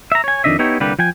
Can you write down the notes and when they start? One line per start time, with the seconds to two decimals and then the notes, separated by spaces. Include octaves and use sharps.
0.12 E5 A#5
0.24 C#5 G#5
0.44 F2 B2 D#3 D4 D#5 E5
0.59 B3 D#4 E4 G4 C#5
0.80 C2 D3 G3 A#3 G4 B4
0.99 F3 G5 G#5